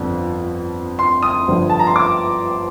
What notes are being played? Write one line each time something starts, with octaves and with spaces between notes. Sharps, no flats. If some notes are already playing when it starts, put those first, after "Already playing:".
Already playing: G1 F2 D3 F3
C6
D#6
G1 G2 D3 F3
A5
A#5
C6
D6